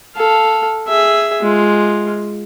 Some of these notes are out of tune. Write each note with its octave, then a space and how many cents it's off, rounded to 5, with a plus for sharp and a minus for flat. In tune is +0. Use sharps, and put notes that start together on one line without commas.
A4 +0 F5 +0
G#4 +0 E5 +5
G#3 +0 F4 +0